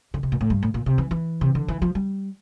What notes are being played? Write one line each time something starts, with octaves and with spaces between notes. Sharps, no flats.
D3
C3
A#2
A2
G2
A2
A#2
C3
E3
E3
C3
D3
E3
F3
G3